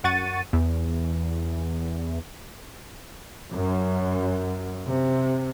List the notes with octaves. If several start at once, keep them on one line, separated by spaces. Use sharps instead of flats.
F#2 F#5 C#6 A6 D#7
E2
F#2
C3